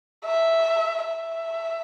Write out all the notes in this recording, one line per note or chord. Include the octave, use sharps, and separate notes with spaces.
E5
E5